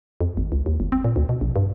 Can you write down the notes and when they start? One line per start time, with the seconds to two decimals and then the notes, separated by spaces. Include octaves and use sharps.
0.21 F2
0.37 G#1
0.52 C#2
0.66 D#2
0.80 G1
0.92 C4
1.04 A#2
1.16 D2
1.29 B2
1.41 A#1
1.56 G2